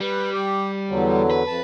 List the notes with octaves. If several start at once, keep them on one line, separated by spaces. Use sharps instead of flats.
G3 B4
G4
E2 D3 F#3
B4
F2 A5